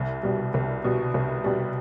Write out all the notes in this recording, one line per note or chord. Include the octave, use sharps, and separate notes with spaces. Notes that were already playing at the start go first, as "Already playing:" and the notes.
Already playing: C2
B2 G3
C2
B2 G3
C2
B2 G3